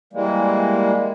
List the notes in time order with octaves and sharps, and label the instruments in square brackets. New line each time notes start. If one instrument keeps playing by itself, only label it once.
[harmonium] E3 G3 G#3 A#3